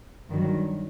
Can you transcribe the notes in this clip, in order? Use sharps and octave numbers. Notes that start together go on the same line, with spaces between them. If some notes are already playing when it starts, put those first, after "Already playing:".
G2 D#3 F#3